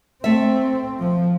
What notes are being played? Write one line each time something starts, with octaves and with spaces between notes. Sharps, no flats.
A3 C4 E5
F3